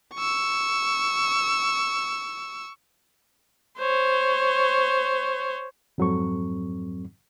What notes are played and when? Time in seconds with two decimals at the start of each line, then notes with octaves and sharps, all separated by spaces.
0.15 C#6 E6
3.79 C5 C#5
5.98 F2 G#2 F#3 C4 A4 C#6